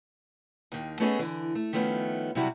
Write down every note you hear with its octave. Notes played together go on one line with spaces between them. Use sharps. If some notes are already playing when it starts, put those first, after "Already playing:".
D#2 D#3
A3 B3 C#4 G#4 A4 D#5
D3 E3
A3
D#3 F3 A3 B3 C#4
C3 F#3 G3 E4 F#4